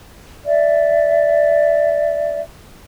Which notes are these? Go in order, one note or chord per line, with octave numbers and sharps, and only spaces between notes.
D5 E5